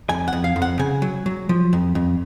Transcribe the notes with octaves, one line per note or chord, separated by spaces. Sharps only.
F2 G#5
F#5
F2
F5
F2
F#5
C#3 G#5
F#3
F#3
F3
F2
F2